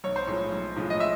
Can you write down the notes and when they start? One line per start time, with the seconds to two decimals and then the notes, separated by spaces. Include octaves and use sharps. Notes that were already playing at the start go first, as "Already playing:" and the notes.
0.04 B1 C#5
0.16 C5
0.27 A2 F3 G#3 C#5
0.52 B1
0.76 A2 F3 G#3
0.90 D#5
1.00 E5